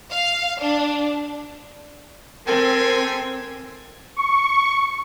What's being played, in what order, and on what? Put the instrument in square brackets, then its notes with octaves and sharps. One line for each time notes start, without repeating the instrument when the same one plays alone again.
[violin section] F5
D4
[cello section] C4 [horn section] G4 A4 G#5 [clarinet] A#4
[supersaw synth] C#6